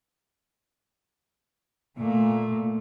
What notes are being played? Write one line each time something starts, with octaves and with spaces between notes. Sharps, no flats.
A#2 A3